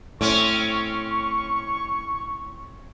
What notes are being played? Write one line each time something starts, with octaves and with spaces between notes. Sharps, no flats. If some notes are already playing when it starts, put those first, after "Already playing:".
A2 C4 C#4 C#6